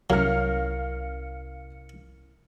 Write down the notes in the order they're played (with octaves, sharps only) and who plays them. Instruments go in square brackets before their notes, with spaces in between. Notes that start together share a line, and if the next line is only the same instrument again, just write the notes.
[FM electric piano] C2 C#7 [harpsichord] F#3 [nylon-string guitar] C#4 E4 A#4 [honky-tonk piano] F5 F6